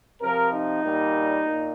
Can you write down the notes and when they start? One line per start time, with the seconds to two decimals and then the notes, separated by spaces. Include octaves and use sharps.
0.22 C3 F3 A#4
0.53 D#4
0.83 A#2 G3
1.44 A#2